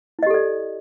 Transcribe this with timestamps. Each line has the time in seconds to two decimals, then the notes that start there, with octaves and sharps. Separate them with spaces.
0.19 E4
0.23 D#5
0.26 G4
0.30 A4
0.34 D5